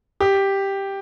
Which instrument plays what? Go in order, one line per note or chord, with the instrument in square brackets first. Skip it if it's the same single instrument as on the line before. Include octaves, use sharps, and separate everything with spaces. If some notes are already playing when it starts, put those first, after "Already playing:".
[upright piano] G4